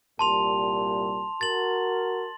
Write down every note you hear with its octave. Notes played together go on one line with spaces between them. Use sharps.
C2 A#2 G3 A5 C6 F7
F#4 A#4 A6 F#7